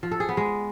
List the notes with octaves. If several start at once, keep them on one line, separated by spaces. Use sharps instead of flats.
F3
A4
G#4
B3
G#3